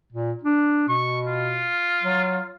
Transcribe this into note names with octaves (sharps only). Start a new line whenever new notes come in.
A#2
D4
B2 C#6
F4
F#3